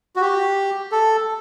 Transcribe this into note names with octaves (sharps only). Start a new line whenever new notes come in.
F#4
G4
A4